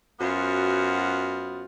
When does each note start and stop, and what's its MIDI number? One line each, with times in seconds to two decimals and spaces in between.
0.20 1.65 42
0.20 1.65 59
0.20 1.65 65
0.20 1.65 66
0.20 1.65 72